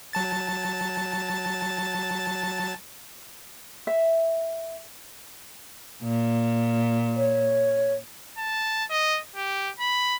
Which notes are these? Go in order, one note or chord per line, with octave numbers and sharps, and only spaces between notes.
F#3 A5 A6
E5
A#2
C#5
A5
D#5
G4
B5